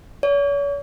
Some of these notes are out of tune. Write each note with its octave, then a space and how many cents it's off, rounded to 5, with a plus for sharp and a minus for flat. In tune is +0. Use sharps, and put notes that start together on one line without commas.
C#5 +40